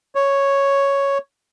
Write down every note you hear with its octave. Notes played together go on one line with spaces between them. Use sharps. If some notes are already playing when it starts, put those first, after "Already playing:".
C#5